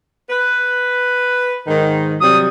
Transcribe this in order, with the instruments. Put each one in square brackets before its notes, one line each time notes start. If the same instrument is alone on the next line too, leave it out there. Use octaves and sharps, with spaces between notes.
[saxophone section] B4
G#2 D#3
[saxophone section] C3 F#3 G3 [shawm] D#6